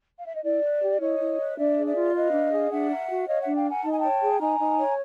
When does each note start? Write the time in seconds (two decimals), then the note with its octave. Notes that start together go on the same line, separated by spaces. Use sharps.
0.17 F5
0.26 E5
0.35 D#5
0.44 E4 D5
0.63 B4
0.82 G4
1.01 E4 C#5 D#5
1.20 E4
1.39 B4
1.57 D4 D5 E5
1.77 G#4
1.86 D5 E5
1.95 F4
2.14 B4 D#5 F5
2.33 D4
2.52 G#4
2.70 D4 E5 F#5
2.89 A#4
3.09 F#4
3.27 C#5 D#5 F5
3.42 D4 E5 F#5
3.55 F5 G5
3.65 A#4 F#5 G#5
3.83 D#4 A5
3.91 G#5
3.99 C#5 G5 A5
4.21 G#4
4.40 D#4 G#5 A#5
4.59 D#4
4.78 C#5